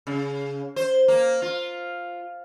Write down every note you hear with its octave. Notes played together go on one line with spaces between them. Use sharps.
C#3
C5
A#3
F4